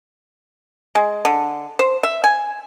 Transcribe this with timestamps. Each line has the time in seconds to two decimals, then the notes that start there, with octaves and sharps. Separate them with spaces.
0.95 G#3
1.25 D3
1.79 C5
2.03 E5
2.24 G#5